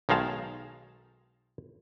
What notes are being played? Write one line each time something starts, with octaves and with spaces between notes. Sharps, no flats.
B1 D#3 G#3 F5 A5